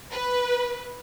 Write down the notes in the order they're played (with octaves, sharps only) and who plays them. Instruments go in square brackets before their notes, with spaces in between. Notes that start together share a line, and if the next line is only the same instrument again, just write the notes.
[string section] B4